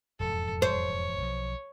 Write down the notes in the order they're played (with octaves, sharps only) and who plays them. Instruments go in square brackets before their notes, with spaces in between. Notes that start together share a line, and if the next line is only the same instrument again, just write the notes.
[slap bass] E1 F2 G#2 [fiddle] A4
[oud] C5 [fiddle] C#5
[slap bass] B1 F3